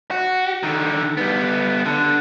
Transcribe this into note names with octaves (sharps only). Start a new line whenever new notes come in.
F#4
D3 D#3
G3 B3
D3